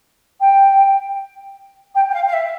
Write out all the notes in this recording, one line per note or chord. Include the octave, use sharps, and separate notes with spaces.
G5
G5
G5
F5
F5
E5